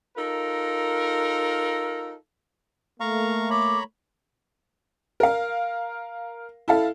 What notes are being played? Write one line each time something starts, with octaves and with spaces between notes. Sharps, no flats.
D#4 F4 A4 A#4
A3 A#3 F5 A#5 C#6
C#5 A#5 B5 D6
A#4 F5
E4 A4 F5